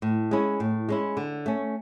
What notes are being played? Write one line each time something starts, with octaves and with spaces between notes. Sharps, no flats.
A2
G#3 C#4 E4
A2
G#3 C#4 E4
D3
A3 C#4